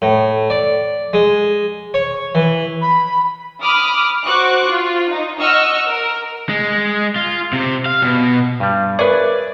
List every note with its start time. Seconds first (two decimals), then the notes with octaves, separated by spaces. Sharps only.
0.02 A2
0.50 D5
1.13 G#3
1.94 C#5
2.35 E3
2.82 B5
3.61 B5 D6 D#6 F6
4.26 F#4 C5 C#6 D6 F#6
4.71 F4
5.11 D#4
5.40 D#5 F#5 C#6 E6 F6
5.88 A#4
6.49 G#3
7.16 F4
7.53 C3
7.86 F5
8.02 B2
8.60 G2 G3
8.99 G#4 A#4 B4 C#5 D5 E5